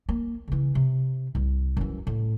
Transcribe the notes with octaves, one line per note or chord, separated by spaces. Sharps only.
A#3
C#3 E3
C3
C2
F#2 E3
A2